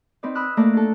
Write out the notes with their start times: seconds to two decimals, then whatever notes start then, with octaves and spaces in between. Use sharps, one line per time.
0.23 C4 D#4 B4 D5
0.35 B5 D#6 E6 F#6
0.57 A3 A#3 D5 A#5 F#6
0.73 D4 A4